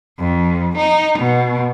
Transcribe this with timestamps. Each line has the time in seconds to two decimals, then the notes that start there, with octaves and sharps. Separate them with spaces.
0.19 F2
0.78 D#4
1.20 B2